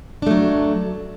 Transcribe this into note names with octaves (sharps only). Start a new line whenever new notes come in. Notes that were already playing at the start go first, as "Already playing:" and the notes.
F#3 A3 D4